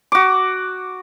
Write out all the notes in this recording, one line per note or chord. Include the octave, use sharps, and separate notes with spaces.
F#4 D6